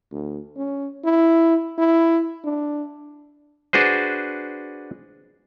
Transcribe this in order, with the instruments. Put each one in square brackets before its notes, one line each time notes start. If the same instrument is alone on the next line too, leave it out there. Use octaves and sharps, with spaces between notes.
[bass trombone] D2
C#4
E4
E4
D4
[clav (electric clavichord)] D4 F#4 G#4 B4 C5